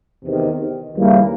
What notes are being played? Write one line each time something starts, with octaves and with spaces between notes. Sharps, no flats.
E2 C3 D#3
D#2 C#3 E3 G3 A#3